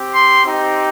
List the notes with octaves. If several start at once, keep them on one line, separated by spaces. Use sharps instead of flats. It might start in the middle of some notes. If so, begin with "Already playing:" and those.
Already playing: C4 G4
C6
C4 D#4 G4